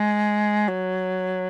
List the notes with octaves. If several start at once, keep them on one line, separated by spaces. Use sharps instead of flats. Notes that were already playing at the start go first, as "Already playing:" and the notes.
Already playing: G#3
F#3